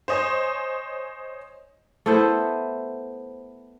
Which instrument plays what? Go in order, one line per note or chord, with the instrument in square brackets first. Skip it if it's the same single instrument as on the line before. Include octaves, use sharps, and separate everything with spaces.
[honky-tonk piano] C5 C#5 D#5 G#5
[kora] A3 B3 E4 C5